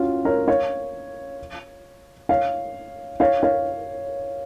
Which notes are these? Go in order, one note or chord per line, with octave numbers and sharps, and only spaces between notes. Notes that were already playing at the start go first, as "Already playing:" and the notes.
Already playing: C#4 F4 F#4
A#4 C#5
C#5 F5
C#5 F5
C#5 F5
C#5 F5